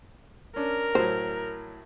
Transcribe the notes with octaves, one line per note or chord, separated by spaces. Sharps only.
C#4 D4 A#4
A2 F#3 C5